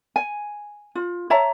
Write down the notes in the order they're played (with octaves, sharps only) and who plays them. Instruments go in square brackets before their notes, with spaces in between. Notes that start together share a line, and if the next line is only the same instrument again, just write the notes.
[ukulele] G#5
F4
C#5 E5 A5 A#5